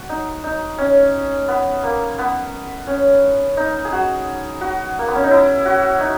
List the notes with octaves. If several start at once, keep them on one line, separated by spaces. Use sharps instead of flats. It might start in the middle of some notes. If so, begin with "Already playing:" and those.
Already playing: F#4
D#4
D#4
C#4
B3
A#3
B3
C#4
D#4
G#4
F#4
F#4
A#3
B3
C#4
D#4
E4
F#4
D#4